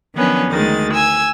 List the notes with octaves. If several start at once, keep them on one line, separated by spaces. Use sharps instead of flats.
D#3 F3 F#3 B3 C#4 D4
D2 D#3 G#3 A6
G#5 E6 G#6